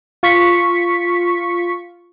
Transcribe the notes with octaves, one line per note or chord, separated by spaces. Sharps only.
F4 C#6 B6